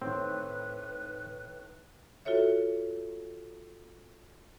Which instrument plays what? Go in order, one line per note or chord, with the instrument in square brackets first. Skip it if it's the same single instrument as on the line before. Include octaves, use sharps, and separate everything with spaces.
[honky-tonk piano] A2 D#3 [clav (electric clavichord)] C4 [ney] B4
[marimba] F4 F#4 A4 C#5 E5